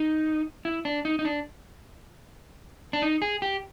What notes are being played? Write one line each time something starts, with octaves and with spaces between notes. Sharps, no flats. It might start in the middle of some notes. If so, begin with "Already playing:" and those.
Already playing: D#4
E4
D4
D#4
D#4
D4
D4
D#4
G#4
G4